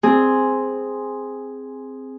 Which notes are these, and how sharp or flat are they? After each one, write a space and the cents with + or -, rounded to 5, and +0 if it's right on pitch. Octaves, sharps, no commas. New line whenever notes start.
C4 +0 G#4 +0